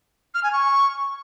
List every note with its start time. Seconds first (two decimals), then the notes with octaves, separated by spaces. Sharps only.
0.34 F6
0.44 G#5
0.53 C#6